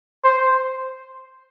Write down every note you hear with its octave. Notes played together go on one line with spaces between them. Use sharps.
C5